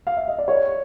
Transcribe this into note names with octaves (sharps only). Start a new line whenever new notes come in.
F5
E5
D#5
D5
C#5